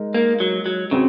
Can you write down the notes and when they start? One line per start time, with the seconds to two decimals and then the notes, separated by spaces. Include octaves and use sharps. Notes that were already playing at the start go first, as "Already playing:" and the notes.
Already playing: G#3 D#4 A#4
0.14 A#3
0.40 F#3
0.66 F#3
0.91 C#3 C4 F#4